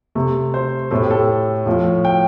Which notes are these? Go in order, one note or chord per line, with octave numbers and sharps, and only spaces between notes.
C3 A3
C5
A2 A3 A4
G4
A4
A2 F3 A3
G5